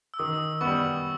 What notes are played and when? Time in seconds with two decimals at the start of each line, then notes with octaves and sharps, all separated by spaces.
0.14 E6
0.19 D#3 D#6
0.61 G3 B3 C#6